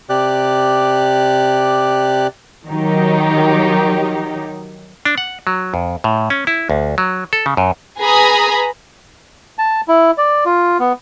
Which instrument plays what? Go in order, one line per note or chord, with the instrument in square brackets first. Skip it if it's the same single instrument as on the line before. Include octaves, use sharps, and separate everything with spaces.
[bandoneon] C3 G4 D5 F#6
[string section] D#3 F#3 D#4 G4
[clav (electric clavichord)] D4
F#5
F#3
F2
A2
C#4
E4
D2
F#3
A4
C#3
F#2
[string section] G#4 B4 G#5 A#5 B5 D#6
[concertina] A5
E4
D5
F4
B3